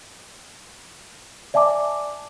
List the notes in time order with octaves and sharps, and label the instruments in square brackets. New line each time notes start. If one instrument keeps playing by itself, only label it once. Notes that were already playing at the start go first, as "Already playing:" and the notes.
[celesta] D5 E5 G#5 A5 D6